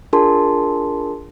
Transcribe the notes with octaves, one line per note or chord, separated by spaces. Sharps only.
D4 F4 G#4 A#4 A5 C6